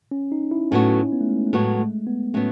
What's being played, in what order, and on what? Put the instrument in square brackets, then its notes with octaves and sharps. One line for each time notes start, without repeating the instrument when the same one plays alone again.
[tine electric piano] C#4
D#4
E4
[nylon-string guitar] A2 F#3 B3 F#4 [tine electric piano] C#4
[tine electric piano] B3
A3
G#3
A3
A3
[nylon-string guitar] A2 F#3 B3 F#4 [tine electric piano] G#3
[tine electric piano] A3
B3
[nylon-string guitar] A2 F#3 B3 [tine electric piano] C#4